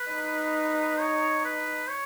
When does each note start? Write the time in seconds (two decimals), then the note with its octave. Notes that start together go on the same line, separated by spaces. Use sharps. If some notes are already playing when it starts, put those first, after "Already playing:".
Already playing: B4
0.12 D#4
1.00 C#5
1.45 B4
1.90 C#5